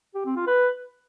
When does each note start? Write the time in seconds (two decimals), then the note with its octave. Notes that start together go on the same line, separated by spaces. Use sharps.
0.15 G4
0.26 C4
0.36 F4
0.47 B4